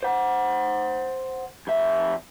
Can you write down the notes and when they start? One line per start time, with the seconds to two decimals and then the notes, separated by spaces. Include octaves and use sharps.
0.03 C5 F#5
1.67 F2 E5